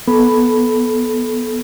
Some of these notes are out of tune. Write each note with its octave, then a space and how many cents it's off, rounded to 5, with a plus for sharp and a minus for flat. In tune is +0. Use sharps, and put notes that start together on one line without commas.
B3 -15 A4 -20 B5 +0